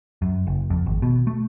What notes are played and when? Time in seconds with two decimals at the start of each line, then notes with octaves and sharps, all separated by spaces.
0.22 F#2
0.47 F#1
0.70 F2
0.86 G#1
1.02 B2
1.27 A3